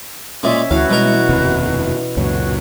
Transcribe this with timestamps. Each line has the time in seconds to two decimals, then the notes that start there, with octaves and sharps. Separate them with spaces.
0.43 A#2 G#3 C#4 C#5 E5
0.71 D2 E3 E4 F#4 C#5 F5
0.90 B2 G3 G#3 A#4
1.29 F1 D#2 C3 B4
2.17 C#2 F#2 A#2 F#4 C#5